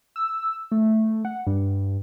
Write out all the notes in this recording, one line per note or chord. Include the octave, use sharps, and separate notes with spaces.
E6
A3
F#5
G2